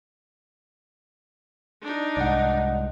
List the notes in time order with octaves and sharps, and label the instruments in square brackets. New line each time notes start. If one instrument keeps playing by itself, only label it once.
[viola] D4 D#4
[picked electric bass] C2 G#2 [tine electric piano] D5 D#5 F#5